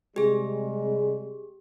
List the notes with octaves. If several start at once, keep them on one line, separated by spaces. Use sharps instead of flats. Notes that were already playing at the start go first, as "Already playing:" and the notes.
C3 G3 G#3 G4 G#4